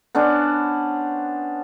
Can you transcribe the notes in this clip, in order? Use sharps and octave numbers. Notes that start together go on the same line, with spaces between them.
B3 C#4 D4 C5